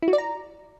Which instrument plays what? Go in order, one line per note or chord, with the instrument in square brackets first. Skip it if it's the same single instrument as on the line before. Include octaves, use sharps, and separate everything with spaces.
[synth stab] E4
F#4
D5
A#5